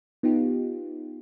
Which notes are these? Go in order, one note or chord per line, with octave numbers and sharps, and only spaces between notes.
B3 D#4 F4 G4